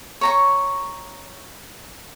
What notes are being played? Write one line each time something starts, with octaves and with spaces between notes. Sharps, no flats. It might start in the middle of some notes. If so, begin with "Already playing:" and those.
C#5 A#5 C#6